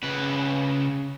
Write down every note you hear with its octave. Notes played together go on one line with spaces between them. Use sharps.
C#3 B4